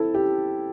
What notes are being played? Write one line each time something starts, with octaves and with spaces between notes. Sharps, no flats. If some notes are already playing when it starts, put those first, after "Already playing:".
Already playing: C4 E4 A4
G4